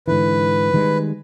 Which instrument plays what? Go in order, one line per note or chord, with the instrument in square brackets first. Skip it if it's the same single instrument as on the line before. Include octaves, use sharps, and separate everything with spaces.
[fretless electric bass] G#2 D3 E3 [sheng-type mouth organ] B4
[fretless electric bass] D#3 G3 G#3